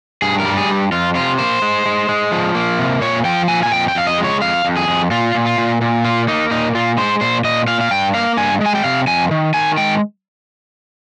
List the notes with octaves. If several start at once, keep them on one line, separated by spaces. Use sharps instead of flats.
G2 G#4
A#4
G3
G#4
G2
F2 F4
C3 F4
A#3 C5
G#3
G#3
G#3
F3
A#3
C3
A#2 C#5
F3 G5
A#2 G#5
G#5
F2 G5
G5
F2 F5
D#5
G#3
C#5
F2 F5
F2
G#4
F2
A#2 F4
A#2
F4
A#2
A#2
A#3 F4
A#3 D#4
A#2 D#4
A#2 F4
G#3 C5
A#2 C5
A#2 D#5
A#2 F5
F5
G2 G5
A#3 F5
G2 G#5
G#3
G#5
G5
C3 F5
F2 G#5
D#3
D#3 G#5
G#3 G5